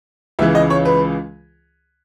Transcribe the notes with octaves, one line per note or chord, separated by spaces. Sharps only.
C#2 C#3 E3 E5
D#5
C#5
B4